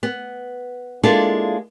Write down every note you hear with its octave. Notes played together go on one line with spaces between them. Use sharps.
B3
G#3 A#3 D4 E4 F4 A4